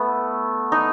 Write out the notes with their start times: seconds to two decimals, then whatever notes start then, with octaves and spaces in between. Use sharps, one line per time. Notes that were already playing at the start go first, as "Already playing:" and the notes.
Already playing: A3 B3
0.72 D#4